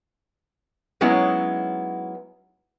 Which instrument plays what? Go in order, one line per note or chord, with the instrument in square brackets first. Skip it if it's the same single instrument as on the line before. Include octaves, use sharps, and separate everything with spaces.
[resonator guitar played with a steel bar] F#3 G#3 B3 C#4 D#4 E4